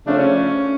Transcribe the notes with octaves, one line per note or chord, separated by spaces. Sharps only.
C#3 F3 A3 C#4 D4
C#4